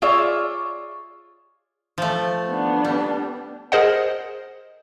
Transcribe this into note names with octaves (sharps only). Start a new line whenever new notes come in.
F4 G#4 C#5 D5 E5
F3 A3
B3 D4
G3
G#4 A#4 C5 D#5 F#5